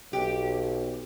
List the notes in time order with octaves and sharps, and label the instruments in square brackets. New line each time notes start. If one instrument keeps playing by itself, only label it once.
[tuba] B1 [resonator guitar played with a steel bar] G4